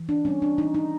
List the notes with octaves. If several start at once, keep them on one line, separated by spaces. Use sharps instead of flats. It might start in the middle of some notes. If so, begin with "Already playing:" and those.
Already playing: E3
D4
G3 C4 C#4
D4
E3 D#4
D#4